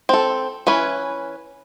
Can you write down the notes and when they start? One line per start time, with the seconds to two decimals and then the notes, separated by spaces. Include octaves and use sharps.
0.09 C4 A4
0.67 E3 C#4 B4